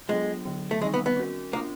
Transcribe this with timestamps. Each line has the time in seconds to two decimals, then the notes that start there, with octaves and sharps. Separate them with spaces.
0.09 F#3 G#3 B3 D4 F4 A4
0.45 D3 F#3 B3
0.71 A3
0.81 D#3 G3 G#3 C4 D#4
0.94 B3
1.06 B3
1.17 C#4 F#4 A#4
1.53 A#3 B3 D4 F4